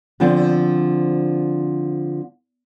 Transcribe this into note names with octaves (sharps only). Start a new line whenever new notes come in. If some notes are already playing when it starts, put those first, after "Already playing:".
D3 F3 C4